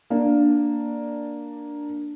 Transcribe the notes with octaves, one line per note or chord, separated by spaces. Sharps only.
A#3 D4